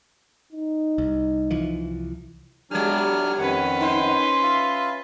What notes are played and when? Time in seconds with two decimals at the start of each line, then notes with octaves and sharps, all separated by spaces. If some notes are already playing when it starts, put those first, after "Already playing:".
0.52 D#4
0.98 C2
1.51 C2 E3 F3
2.71 F#3 G3 D4 G4 F6
3.38 F2 D#3 C#4 B4 F#5
3.81 D#4 C5 C6
4.43 F4 E5 F5